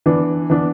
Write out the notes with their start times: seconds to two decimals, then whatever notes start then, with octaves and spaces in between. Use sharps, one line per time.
0.06 E3 B3 D4
0.50 E3 B3 D4